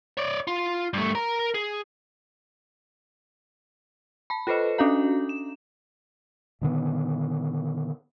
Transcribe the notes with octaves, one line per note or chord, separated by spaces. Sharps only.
C#5 D5
F4
G2 A3
A#4 A#5
G#4
A5 B5
F4 A4 B4 C5 D#5
C#4 D4 F#4 A4 F5 A#5
E7
A#2 D3 D#3 B3